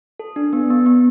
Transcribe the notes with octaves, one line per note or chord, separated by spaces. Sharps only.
A4
D4
B3
B3
B3